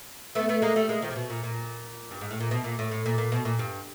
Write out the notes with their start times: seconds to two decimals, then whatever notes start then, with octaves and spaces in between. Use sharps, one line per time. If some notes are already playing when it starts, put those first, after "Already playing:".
0.35 A3 B3
0.49 A3 B3
0.62 G#3 A#3
0.76 G3 A3
0.89 G#3 A#3
1.02 D#3 F3
1.11 C3
1.16 B2
1.30 A#2
1.43 A#2
2.11 G2
2.21 G#2
2.31 A2
2.40 A#2
2.51 B2
2.64 A#2
2.79 A2
2.92 A2
3.06 A#2
3.18 A#2
3.32 B2
3.45 A#2
3.59 G2